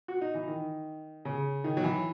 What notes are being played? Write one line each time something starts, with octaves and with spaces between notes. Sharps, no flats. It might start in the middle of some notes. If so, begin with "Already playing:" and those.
F#4
D#4
E3
D#3
C#3
D#3
F#3
E3